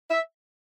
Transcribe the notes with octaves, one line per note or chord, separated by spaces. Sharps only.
E5